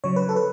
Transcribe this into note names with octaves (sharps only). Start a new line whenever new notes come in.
C#3 F#3 C#5
B4
A4
B4